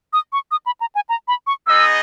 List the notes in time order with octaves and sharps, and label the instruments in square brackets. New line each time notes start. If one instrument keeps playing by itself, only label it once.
[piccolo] D#6
C#6
D#6
B5
A#5
G#5
A#5
B5
C#6
[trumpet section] B3 D#4 G#4 D#5 [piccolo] E6